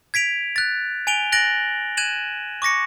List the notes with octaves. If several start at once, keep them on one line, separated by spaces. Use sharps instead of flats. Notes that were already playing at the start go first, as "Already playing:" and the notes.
G#6 B6 D7 F7
F#6 A6
G#5 D7 F7 G7
F#6 A6 A#6 D7 F#7
F#6 G#6 D#7 E7 F#7
C#6 D6 A#6 C#7